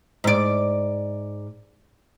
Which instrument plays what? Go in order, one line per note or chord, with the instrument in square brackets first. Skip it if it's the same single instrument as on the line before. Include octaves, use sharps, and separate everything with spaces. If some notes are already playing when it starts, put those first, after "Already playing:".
[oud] G#2 D5